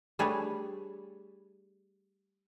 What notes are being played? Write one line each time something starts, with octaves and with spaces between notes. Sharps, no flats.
G3 A3 D4 G#4 B4 C#5